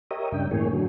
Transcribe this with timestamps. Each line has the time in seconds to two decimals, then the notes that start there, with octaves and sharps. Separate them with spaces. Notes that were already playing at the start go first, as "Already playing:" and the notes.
0.11 G4 A#4 C#5 D#5 E5 D#6
0.32 G2 C#3 D4 G5
0.51 A2 E3 A#3 G#4 C#5
0.73 D3 F#3